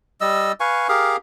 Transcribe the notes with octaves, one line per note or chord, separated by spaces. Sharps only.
G3 D#5 E6
B4 F5 G#5 C#6
G4 G#4 A#4 F5